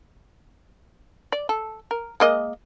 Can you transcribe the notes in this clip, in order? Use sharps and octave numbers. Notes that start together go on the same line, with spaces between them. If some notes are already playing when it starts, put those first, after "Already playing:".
D5
A4
A#4
G#3 A#3 D#5